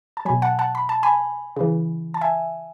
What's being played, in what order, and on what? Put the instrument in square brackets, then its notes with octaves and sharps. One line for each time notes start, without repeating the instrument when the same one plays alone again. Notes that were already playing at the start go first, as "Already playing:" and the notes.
[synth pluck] A5
B2 F#3 G#5 B5
F#5 A5
F#5 A5
B5
A5
G#5 B5
C#3 E3
A5
E5 G#5